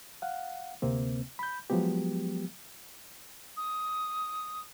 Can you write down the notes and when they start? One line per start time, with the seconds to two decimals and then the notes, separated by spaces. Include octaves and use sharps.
0.22 F5 F#5
0.82 D2 C3 A#3 C4
1.39 B5 G6
1.70 F3 F#3 G#3 B3 G4
3.57 D#6